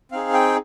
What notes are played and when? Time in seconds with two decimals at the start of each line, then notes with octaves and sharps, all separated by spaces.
0.12 C4 D#4 G#4 F5
0.34 G5